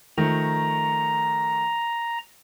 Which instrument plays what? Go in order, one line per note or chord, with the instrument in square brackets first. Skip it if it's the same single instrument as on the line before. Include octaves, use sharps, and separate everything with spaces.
[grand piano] D#3 F3 A3 [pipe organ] A#5